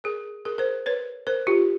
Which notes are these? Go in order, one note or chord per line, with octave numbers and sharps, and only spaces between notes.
G#4 A#4
G#4 A#4
A#4 C5
B4 C#5
A#4 C5
F4 G4